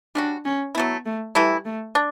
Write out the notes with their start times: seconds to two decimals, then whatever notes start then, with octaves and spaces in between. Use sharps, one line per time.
0.15 G3 C#4 D4 F#4
0.45 C#4
0.75 F#3 A3 B3 E4
1.06 A3
1.35 E3 G3 A3 E4
1.65 A3
1.95 D4